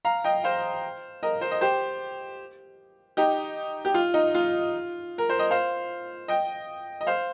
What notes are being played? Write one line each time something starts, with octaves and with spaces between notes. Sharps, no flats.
F5 A#5
D#5 G5
C5 F5
A#4 D#5
C5
D#5
G4 C5
D#4 G4
G4
F4
D#4
F4
A#4
C5
D#5
C5 F5
D#5 G5
D#5
C5 F5